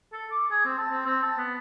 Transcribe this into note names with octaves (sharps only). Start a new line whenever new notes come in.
A4
D6
G#4
C4
A5
C4
C4
A5
B3